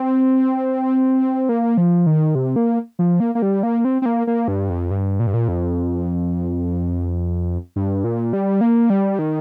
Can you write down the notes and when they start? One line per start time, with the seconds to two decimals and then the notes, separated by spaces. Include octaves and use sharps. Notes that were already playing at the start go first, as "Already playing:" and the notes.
Already playing: C4
1.49 A#3
1.77 F3
2.06 D#3
2.35 C3
2.56 A#3
2.99 F3
3.20 A#3
3.35 A#3
3.42 G3
3.63 A#3
3.85 C4
4.02 C4
4.06 A#3
4.27 A#3
4.48 G2
4.70 F2
4.91 G2
5.20 A#2
5.27 G2
5.34 A#2
5.48 F2
7.76 G2
8.04 A#2
8.33 G3
8.61 A#3
8.90 G3
9.19 D#3